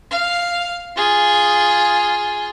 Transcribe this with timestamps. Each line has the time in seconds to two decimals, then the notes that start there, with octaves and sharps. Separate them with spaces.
0.11 F5
0.97 F4 G#4